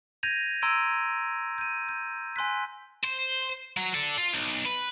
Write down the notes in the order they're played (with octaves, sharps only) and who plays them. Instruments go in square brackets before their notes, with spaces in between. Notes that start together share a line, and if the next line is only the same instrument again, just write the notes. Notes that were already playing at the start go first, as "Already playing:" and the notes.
[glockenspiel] G6 G#6 A#6 D#7 F7
A#5 C6 E6 G#6 D7 D#7
G6 D#7
G6
G#5 C6 F#6 B6
[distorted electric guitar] C5
F#3
A4 D5
F4
B1
B4